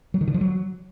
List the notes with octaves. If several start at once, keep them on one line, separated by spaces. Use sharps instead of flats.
F#3
D#3
D3
F3
F#3